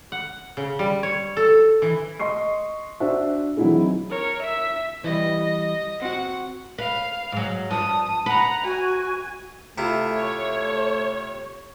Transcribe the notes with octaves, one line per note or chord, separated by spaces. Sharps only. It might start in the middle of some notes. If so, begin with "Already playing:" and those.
F#5
C#3
G3
C#5
A4
E3
D#5 C6 C#6 C7
D4 F#4 C5 E5
E3 F#3 C4 D#4 E4 G#4
A#4 C#5
E5 B6
E3 G3 D#5
C4 F#4 F#5
B4 F5
G#2 F#3
G2 F3 A5 D#6
B4 F#5 A#5
F#4 G#5
C3 A3 E4 F4
C#5